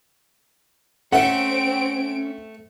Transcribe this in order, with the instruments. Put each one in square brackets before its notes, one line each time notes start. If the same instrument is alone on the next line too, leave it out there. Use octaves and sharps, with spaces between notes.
[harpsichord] A3 A4 E5 [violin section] C4 D7 [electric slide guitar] C#4 [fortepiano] F#5